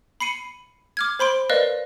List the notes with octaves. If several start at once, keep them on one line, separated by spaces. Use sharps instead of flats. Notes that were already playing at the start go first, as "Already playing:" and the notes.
B5 C7 C#7 D#7
D6 F6 G#6
C5 B5 C6 D7
A#4 B4 D5 D#5 F5 F#6